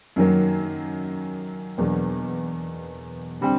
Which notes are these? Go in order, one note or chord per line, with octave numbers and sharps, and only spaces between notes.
F#2 D#3 F#3 A#3
E2 B2 F#3 A#3 D4
D3 G3 C4